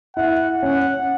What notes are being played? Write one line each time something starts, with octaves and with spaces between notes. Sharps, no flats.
E4 F#5
C#4 F#5